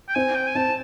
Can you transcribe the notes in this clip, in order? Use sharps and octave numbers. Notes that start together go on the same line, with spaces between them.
G5
C4 G#5
G5
G#5
C4 A5